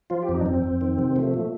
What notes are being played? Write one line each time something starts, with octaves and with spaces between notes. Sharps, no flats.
F3 F4
G4
F2
D#4
D4
F2 C4
F2
D#3
C3
F3 A3
A#2